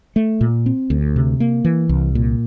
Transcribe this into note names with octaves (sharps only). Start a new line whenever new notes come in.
A3
A#2
C4
D2
C3
A#3
E3
C2
A#2